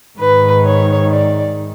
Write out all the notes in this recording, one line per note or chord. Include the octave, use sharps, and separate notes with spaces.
G#2 D#3 B4
C#5
D5